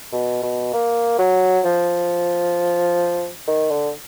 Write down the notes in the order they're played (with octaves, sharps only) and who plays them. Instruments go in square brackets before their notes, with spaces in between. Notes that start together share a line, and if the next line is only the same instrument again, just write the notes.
[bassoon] B2
B2
A#3
F#3
F3
D#3
D3